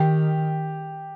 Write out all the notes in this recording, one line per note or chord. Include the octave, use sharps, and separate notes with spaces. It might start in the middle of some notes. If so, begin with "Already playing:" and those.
Already playing: D#3 G4